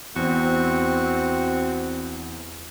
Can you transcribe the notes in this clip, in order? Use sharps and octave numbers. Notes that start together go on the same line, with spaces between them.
E2 C4 F#4